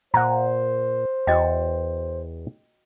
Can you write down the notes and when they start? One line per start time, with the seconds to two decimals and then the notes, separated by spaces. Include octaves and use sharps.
0.14 A#2 C5 F#5 A#5
1.27 E2 F#4 D#5 G5